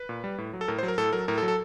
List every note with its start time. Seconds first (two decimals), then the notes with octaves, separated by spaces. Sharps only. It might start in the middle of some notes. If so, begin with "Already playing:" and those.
Already playing: B4
0.09 A#2
0.24 G3
0.38 A2
0.53 F#3
0.61 A4
0.68 A2 A#4
0.78 C5
0.83 F#3
0.88 A#4
0.98 A2 A4
1.13 F#3 A#4
1.28 A2 A#4
1.38 A4
1.42 F#3
1.48 A4